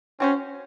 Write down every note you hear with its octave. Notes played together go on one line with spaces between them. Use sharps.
C4 C#4 F#4 C5